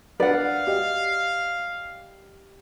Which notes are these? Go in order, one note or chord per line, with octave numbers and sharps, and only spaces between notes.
D4 B4 D5 F5 F#5
G4 D#5